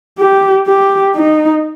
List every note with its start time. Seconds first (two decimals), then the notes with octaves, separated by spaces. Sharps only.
0.19 G4
0.67 G4
1.15 D#4